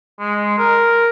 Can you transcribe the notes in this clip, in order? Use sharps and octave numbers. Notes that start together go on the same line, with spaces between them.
G#3
A#4